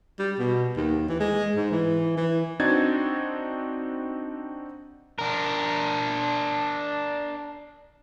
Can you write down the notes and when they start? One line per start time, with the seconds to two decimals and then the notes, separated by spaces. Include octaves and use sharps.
0.19 G3
0.39 B2
0.77 D#2
1.09 E3
1.20 G#3
1.56 G#2
1.71 E3
2.17 E3
2.60 C4 D4 D#4 F#4 G#6 A6
5.19 D4 A#4